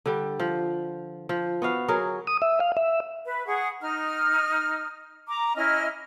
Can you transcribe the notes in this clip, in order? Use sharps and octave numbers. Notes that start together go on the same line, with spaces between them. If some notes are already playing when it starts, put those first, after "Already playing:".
D3 G3
F3
F3
B3 F#4 F5
F#3 G#4 A#4
D#6
E5
F5
E5
B4
G#4 F#5 C#6
D#4 F6
A#5 D6
C#4 E4 D#5 F6